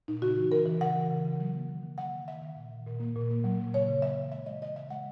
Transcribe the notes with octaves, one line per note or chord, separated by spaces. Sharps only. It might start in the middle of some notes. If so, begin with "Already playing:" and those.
A#2 D#4
C#3 F#4
E3
E3 A#4
E3
C#3 F#5
E3
C#3
C#3
F#3
A#3
D#3
D#3
D#3 F#5
D#3
D#3 E5
D#3
A#2
A#2
A#2
A#3
A#2
A#3
F#3
A#2
C#3 C#5
C#3
C#3 E5
E3
G#3 E5
G#3 D#5
C#3 D#5
C#3 E5
G#3 F#5